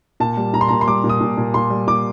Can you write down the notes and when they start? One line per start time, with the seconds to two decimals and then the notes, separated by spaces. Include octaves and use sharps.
0.20 A#2 A5
0.37 G3
0.54 A#2 A#5
0.61 C6
0.68 A#2 A#5
0.81 C6
0.87 G3 D6
1.04 A#2
1.09 D#6
1.21 A#2
1.38 A#2
1.54 A#2 C6
1.70 G3
1.87 A#2 D6